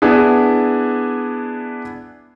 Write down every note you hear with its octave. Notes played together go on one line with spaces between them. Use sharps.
B3 D4 E4 G#4